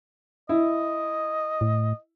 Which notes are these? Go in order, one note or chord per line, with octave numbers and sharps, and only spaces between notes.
E4 D#5
A2